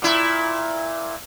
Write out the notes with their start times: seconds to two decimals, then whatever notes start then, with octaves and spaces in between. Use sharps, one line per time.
0.02 A#2 E4